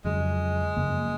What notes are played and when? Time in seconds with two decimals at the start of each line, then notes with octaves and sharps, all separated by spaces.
0.04 F2 C#3 F#3 G#3
0.76 F#2 C#3 F3 A#3